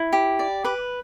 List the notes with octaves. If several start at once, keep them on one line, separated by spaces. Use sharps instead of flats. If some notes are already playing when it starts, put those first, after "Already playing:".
Already playing: E4
G4
D5
B4 D6